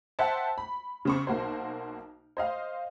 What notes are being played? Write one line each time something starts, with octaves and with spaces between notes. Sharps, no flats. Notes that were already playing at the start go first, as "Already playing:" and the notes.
C5 E5 F#5 G5 A5
B5
C#3 C4 C#6
B1 A#3 F#4 C5
C5 D#5 F5